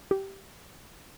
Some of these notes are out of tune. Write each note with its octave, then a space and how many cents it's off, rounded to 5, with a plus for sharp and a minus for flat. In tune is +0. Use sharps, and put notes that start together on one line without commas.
G4 -10